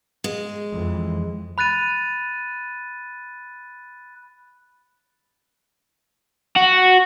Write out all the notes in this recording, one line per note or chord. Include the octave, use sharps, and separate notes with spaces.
G#3
F2 E3
B5 F#6 A6 D#7
F#4